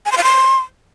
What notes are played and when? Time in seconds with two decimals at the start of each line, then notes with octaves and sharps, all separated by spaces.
0.06 G#5
0.12 C6
0.18 F5
0.24 C6